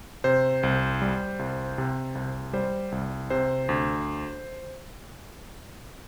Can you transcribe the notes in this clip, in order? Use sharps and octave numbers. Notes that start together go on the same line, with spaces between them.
C3 C5
C2
G3
C2
C3
C2
G3 C5
C2
C3 C5
D2